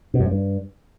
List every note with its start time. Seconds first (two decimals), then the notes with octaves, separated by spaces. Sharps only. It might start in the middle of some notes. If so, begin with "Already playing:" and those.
0.14 B2
0.20 F#2
0.26 G#2
0.31 G2